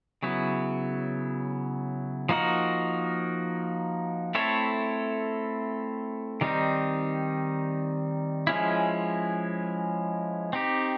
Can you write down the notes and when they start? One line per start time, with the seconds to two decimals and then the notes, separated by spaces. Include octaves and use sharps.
0.23 C#3 F#3 B3 E4
2.29 F3 A#3 D#4 F#4 A#4
4.35 A3 C4 E4 A4 C#5
6.41 D#3 G3 C4 D#4
8.47 F3 G#3 C#4 E4
10.53 C4 D#4 G4